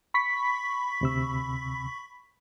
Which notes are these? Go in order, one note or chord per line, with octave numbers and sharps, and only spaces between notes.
B5 C#6 B6
D2 C3 E6